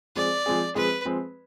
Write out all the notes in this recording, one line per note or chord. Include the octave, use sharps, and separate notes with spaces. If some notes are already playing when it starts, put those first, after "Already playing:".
F3 G#3 C4 G#4 D5
F3 G#3 C4 G#4
F3 G#3 C4 G#4 B4
F3 G#3 C4 G#4